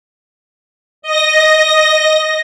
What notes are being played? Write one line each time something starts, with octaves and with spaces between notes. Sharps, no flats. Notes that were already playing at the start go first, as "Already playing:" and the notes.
D#5 A#6